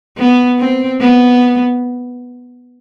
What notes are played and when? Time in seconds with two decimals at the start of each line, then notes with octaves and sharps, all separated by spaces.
0.18 B3
0.59 C4
1.01 B3